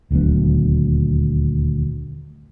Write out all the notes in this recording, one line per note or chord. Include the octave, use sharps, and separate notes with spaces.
D#1 D2 F#3 B3